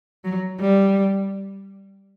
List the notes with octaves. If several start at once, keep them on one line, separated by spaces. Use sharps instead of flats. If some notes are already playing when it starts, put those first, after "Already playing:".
F#3
G3